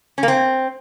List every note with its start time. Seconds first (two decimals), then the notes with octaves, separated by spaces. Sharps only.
0.18 C#4
0.23 A#3
0.28 C4